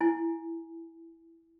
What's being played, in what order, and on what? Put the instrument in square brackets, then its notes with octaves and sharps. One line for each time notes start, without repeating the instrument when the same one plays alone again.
[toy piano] E4 G#5